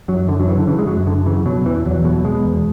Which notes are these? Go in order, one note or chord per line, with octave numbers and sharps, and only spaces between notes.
F#2 F#3
F#2 D3
F#3
C#3 E3
D3
C#3 E3
G#3
F#2 F#3
F#2 D3
C#3 E3
B2 F#3
E2 E3
E2 F#3
B2 F#3
B2 G#3
E2